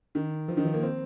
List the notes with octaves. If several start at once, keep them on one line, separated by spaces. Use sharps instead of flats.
D#3
F3
D#3
F3
A#3
C4